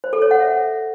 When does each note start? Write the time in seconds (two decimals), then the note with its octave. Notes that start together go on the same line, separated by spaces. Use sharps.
0.04 C5
0.13 A4
0.22 C#5
0.31 F#5
0.40 E5